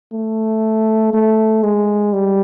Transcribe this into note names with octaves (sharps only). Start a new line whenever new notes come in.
A3
A3
G#3
G3